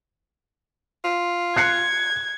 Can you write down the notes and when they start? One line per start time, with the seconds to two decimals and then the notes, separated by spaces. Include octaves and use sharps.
1.04 F4
1.56 F#6 G#6 C7 C#7